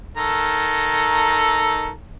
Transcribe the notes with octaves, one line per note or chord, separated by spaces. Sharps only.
D#3 A4 A#5